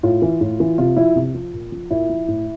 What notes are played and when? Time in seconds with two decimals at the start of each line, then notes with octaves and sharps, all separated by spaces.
0.03 A2 F4
0.22 E3
0.41 A2
0.60 E3
0.78 C3 F4
0.96 F3 E4
1.16 C3
1.34 F3
1.53 A#2
1.72 F3
1.91 A#2 E4
2.09 F3
2.28 A2